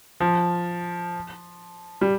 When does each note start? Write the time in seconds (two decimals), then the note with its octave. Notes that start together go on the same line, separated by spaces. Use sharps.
0.20 F3
2.01 G3